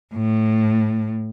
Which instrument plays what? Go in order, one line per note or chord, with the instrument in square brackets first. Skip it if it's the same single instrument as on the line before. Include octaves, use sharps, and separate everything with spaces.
[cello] A2